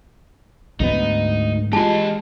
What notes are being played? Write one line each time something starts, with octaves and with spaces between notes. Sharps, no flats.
D2 G#2 A3 B3 D#4
G#3 F4 G4 D#5 A5